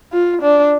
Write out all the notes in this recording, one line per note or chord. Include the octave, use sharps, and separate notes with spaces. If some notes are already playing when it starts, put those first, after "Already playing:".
F4
D4